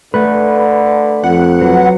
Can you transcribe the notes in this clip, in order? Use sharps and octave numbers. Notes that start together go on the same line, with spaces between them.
D3 A3 B4
F2 F#5
F#3 B4